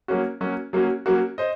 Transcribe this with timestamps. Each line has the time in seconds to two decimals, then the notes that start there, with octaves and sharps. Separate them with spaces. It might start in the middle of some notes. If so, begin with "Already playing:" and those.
0.08 F#3 A#3 C#4 F#4
0.41 F#3 A#3 C#4 F#4
0.73 F#3 A#3 C#4 F#4
1.06 F#3 A#3 C#4 F#4
1.38 C5 D#5